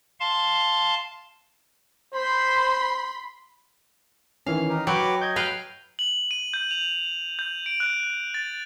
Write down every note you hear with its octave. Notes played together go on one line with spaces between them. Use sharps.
F5 A5 C6
C5 B5 C6
D#3 E3 C#4 F5
D#4 G4 A#4
F#3 F#4 B4 G5 D6
D#5 G6 G#6
B4 F5 G5
F#7
D#7
G6
F7
G6
D7
F#6
A6